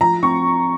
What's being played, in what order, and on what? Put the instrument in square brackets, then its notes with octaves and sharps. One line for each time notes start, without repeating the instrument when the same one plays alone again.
[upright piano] F3 A#5
C4 C#6